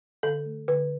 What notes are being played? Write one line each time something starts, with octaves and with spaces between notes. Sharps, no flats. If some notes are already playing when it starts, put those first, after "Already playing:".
D3 A4
A3
D3 B4